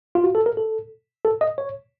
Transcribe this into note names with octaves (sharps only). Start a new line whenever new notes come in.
F4
F#4
A4
A#4
A4
A4
D#5
C#5